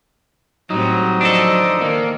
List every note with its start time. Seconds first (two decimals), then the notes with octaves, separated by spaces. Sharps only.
0.70 A2 F#3 G3 C4 D#4
1.21 F3 D4 A4 C5 D#5
1.81 D#3 A#3